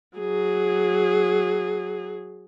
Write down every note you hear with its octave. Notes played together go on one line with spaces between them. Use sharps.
F#3 G#4